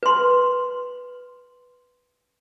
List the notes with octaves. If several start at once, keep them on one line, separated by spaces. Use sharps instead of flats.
B4 C6